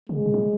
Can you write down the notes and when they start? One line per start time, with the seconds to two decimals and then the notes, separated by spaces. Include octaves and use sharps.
0.09 D3 G#3
0.17 C#3
0.26 B2
0.34 F#3